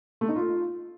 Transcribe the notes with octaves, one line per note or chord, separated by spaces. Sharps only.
A3
D#4
F4